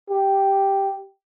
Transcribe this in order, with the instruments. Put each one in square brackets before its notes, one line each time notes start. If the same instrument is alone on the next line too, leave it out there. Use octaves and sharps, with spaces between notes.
[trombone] G4